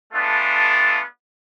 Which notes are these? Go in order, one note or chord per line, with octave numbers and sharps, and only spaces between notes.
G#3 A3 B3 D4 F4 A4